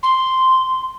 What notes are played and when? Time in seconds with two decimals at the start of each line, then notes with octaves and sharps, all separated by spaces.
0.03 C6